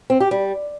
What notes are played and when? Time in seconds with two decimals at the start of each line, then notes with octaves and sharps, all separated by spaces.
0.10 C4
0.20 G4
0.31 G3